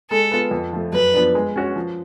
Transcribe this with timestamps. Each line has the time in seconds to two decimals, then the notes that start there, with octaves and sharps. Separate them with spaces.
0.10 G#3 A4
0.31 B3 F4
0.51 F2
0.73 F3 A3
0.92 F#2 B4
1.13 F3 B3 D4
1.35 G#3
1.56 C#4 F#4 C#5
1.76 F3